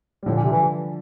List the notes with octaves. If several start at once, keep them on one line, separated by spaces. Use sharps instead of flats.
G3
A2 D3 F3
A#2
C3
E3